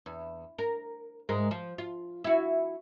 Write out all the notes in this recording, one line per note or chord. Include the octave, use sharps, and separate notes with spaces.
E2
A#4
G#2 G#3 A#4
F3
F4
E4 F#4